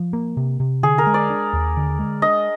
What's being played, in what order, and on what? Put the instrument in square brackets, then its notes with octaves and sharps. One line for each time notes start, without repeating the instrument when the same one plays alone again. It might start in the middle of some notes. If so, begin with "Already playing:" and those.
Already playing: [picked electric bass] F3
A#3
C3
C3
[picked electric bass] D3 [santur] G#4
[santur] A#4
[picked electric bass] G#3
[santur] D5
[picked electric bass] D4
D#2
D3
G#3
[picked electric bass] D4 [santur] D#5